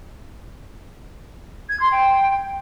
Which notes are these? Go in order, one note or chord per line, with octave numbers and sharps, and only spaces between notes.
G#6
C6
G5